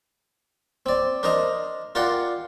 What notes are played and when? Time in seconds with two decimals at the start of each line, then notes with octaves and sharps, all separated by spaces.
0.86 C4 D5
1.23 D4 A#4 C5 D#5 A#5
1.95 F4 A#4 D5 F#5 G5 C6